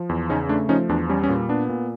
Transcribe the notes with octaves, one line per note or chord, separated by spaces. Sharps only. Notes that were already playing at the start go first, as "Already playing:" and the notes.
Already playing: F3
E2
C#3 C#4 D#4
A3 D4
F3 C#4 D#4
E2 D4
G3 C#4
C#4
A#2
B3 D4
A#2